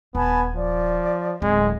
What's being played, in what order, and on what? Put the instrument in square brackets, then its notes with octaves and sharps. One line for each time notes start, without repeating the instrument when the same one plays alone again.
[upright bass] D#1 [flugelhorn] B3 [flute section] G#5 A5 B5
[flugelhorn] F3 [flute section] D5
[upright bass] D1 [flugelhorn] G#3